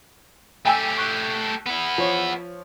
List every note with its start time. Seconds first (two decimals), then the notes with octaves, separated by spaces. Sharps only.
0.65 A3 G4 G5 G#5 E6
0.98 C#6 F#6
1.66 B3 E4
1.98 F3 C#5